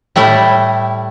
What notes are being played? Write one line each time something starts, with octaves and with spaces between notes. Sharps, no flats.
A2 G3 A3 E4